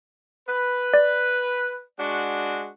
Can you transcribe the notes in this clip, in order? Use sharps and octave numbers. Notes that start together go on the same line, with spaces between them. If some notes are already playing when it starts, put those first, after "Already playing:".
B4
D5
G#3 D4 F#4